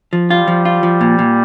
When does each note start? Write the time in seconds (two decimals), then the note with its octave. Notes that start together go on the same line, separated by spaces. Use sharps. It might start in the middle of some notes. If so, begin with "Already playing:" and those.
0.13 F3
0.29 G3 F4
0.48 F3
0.65 F4
0.83 F3
1.01 A#2
1.19 A#2